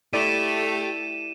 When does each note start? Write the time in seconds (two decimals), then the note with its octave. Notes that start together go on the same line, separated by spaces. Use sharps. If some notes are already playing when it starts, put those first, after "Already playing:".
0.13 A3 E4 G4 D5 E5 D#7 E7